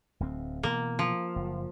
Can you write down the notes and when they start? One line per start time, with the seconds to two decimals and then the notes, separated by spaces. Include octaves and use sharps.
0.20 D1 D2 C4
0.63 B2 E3 A#3
0.99 F3
1.36 F#1